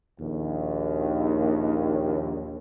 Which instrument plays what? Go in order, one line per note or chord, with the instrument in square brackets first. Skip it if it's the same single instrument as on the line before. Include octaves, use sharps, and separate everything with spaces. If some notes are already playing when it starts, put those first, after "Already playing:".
[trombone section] A#1 D#2